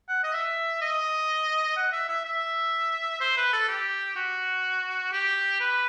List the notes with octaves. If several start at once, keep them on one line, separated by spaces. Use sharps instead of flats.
F#5
D#5
E5
D#5
F#5
E5
E5
E5
C5
B4
A4
G4
F#4
G4
B4